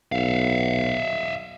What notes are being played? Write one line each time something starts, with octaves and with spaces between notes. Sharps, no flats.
B1 E5 F5